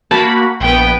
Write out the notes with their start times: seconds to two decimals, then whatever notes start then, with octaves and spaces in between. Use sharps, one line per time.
0.11 A#3 F#4 A5 B5
0.60 A#1 B3 B4 G5